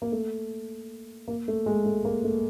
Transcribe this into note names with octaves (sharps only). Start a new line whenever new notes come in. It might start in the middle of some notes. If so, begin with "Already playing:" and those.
A#3
A3
A#3
A3
G#3
A3
A#3
A3